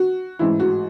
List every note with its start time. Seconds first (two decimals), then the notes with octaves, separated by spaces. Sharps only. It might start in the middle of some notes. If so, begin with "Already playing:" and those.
Already playing: F#4
0.39 A1 G#2 E3 E4
0.60 F#4